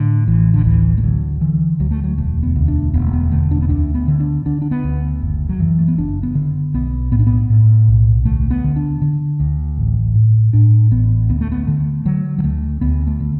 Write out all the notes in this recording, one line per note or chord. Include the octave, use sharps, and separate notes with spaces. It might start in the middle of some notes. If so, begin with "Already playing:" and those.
Already playing: A2 D3
A1 E3
D3
D2 E3
A3
D3 F#3
D3 E3
D2 F#3
A3
F#3
E1 A3
B3
D2
D4
E1 B3
A3
B3
D3 A3
D4
B3
D2 D4
B3
D3
D4
D3 D4
D4
B3
D2
F#1
F#3
F#2 E3
A3
B3
F#1 D4
B3
D3
B1 B3
A2 B3
D4
B3
A2
B1
D2 A3
B3
D3
D4
D3
D2
A1
A2
A2 D4
A1 B3
D2 B3
A3
B3
D3 A3
D3 F#3
F#3
D2 A3
D2 B3
A3
D3